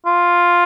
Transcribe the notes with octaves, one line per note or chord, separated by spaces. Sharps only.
F4